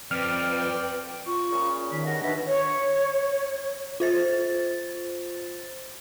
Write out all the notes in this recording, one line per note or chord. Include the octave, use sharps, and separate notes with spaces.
F2 C4 B4 D5 G5 F6
F4 C#6
A#2 C#3
D#3 B6
G2 C#4 F#5 A#6
B2 D4 E5
C#5
F4 C5 A6